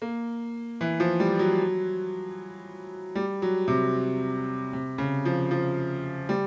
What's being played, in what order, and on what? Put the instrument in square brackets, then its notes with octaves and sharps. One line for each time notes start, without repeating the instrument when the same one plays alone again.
[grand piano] A#3
E3
F3
G3
F#3
G3
F#3
C3
C3
C#3
F3
F3
G3